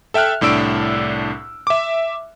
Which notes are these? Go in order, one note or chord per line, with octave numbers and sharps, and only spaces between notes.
A4 E5 G5 F6 F#6
C2 A2 D4 E6 D7
E5 D6